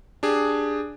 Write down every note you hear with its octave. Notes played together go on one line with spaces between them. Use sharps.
D4 G4 G#4